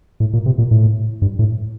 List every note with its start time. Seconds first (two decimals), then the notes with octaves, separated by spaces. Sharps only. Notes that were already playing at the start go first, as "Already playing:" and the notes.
0.20 A2
0.33 A#2
0.46 C3
0.58 A#2
0.71 A2
1.22 G2
1.39 A2